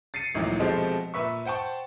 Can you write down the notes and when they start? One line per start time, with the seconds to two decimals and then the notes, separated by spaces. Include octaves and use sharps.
0.14 A6 C7 C#7 D#7
0.34 G#1 D2 A#2 D#3 E3 F#3
0.60 B2 F3 G#3 A3 C4 G4
1.14 A#2 B4 E5 C#6
1.45 C5 F#5 G5 A5 C#6